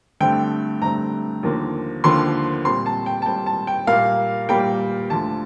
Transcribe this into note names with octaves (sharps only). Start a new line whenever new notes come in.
G2 D3 A3 C4 G5
G2 D3 A3 C4 A#5
D#2 D3 F3 A#3
D#2 D3 F3 A#3 C6
A#2 G3 C4 C6
A5
G5
A5
A#2 G3 C4 G5
A5
G5
A#2 G3 A#3 F5
A#2 G3 A#3 G5
D2 D3 F3 A5